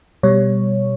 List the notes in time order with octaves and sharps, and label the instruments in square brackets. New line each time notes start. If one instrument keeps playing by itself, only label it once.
[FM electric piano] B2 G3 C#5